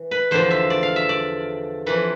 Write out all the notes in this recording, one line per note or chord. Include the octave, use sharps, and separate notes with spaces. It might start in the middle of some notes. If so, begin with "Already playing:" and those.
Already playing: E3
B4
E2 D3 F3 C5
E5
D5
F5
E5
D5
F2 E3 B4